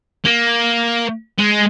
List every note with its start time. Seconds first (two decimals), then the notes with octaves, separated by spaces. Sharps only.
0.25 A#3
1.38 G#3